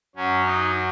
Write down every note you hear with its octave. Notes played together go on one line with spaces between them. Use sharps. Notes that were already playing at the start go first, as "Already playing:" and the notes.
F#2 F#3 C#4
D#4